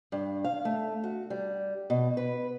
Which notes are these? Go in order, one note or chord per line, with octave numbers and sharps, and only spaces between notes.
G2
F5
A3
F#4
G3
B2
B4